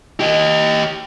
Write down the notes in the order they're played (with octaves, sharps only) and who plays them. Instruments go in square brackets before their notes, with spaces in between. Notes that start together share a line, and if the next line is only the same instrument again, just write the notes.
[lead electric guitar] G4 D#5